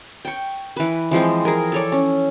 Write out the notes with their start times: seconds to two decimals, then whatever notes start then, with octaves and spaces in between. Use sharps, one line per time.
0.25 G5 C#6
0.76 E3 B4
1.11 E3 F3 G#3 C4
1.45 G#4 A#4
1.72 A4 C#5 D5
1.92 C#4